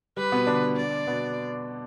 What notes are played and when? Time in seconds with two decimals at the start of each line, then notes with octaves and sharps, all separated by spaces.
0.17 G3 B4
0.32 B2 B3
0.47 D3 D4
0.76 D5
1.06 B2 B3